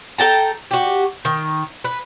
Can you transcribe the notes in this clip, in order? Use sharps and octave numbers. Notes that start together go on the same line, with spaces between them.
A4 G5 A5 A#5
F#4 G4
D#3
B4